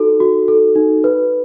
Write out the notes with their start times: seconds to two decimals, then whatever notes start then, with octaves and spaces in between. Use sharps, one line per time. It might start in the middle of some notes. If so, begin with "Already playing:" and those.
Already playing: D#4 F#4 A4
0.20 F#4
0.48 A4
0.75 D#4
1.04 B4